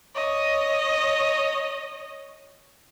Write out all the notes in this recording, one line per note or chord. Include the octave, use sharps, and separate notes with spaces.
C#5 D#5